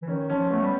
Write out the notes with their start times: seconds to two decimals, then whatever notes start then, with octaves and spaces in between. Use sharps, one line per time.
0.02 E3
0.07 D#3 C#4
0.29 F3 C#4
0.50 A3 B3
0.62 G3